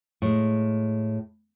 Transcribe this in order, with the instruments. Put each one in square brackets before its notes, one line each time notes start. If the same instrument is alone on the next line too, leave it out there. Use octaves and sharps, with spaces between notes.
[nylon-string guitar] A2 G#3